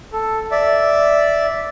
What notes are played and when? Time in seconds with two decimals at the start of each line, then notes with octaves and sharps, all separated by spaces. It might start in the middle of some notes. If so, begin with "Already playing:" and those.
0.13 A4
0.51 D5 E5